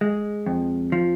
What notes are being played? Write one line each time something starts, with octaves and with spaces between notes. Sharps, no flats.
G#3
F2
F3